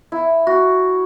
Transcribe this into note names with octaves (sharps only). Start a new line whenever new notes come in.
E4
F#4